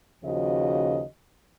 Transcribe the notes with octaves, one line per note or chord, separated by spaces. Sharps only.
D#2 C#3 F3 F#4 D#5